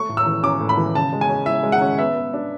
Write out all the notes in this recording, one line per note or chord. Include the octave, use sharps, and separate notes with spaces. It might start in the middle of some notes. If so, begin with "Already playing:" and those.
Already playing: A3 C#6
A2
E6
E3
C#4 D6
A2
B5
E3
C#3 A5
G#3
G#5
C#4
E4 E5
G#3
F#5
C#4
B3 E5
B3
D4